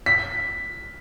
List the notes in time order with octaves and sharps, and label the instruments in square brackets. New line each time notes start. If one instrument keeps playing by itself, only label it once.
[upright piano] B6